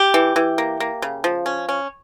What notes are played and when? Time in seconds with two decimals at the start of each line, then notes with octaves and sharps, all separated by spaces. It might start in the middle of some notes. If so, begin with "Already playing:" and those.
Already playing: G4
0.14 E3
0.36 E3
0.58 A#3
0.80 A#3
1.02 C#3
1.24 F3
1.46 C#4
1.69 C#4